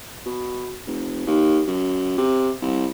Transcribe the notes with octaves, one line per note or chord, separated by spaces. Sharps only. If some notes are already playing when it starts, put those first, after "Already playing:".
B2
F1
D#2
F#2
C3
C2